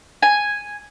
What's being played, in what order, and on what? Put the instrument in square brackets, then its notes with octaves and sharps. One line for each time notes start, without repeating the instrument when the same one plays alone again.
[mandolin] G#5